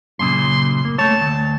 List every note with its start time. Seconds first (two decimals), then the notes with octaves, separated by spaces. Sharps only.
0.19 F#2 A#2 C#3 C6
0.85 A#3
0.99 A3 C#5 A5
1.21 D2